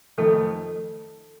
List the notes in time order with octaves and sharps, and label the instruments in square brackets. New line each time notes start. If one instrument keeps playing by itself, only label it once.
[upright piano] F2 D#3 A3 [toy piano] A4